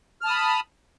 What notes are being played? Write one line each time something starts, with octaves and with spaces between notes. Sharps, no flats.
A5 B5 D#6 F6